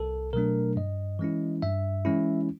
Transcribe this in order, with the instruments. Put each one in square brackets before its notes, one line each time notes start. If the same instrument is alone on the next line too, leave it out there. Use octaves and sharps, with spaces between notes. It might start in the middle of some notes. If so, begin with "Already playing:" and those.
Already playing: [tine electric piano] C2 A4
B2 F#3 A3 D4 A#4
G2 D#5
E3 G#3 C#4 E4
G2 E5
E3 G#3 C#4 E4